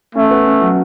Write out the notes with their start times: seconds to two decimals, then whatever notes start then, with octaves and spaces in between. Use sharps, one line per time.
0.15 A3 C#4
0.31 B3
0.47 C#4
0.61 F#3 F#4